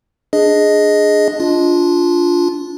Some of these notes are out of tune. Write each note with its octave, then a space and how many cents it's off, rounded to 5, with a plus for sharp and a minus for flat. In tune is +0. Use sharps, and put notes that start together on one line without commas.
D4 +5 G#4 +0 D#5 +0
D4 -15 F4 +0